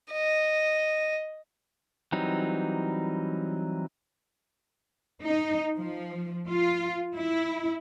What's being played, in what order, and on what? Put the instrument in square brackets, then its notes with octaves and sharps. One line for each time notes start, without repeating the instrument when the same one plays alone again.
[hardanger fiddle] D#5
[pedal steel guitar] E3 F#3 G3 C4 D#4
[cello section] D#4
F3
F4
E4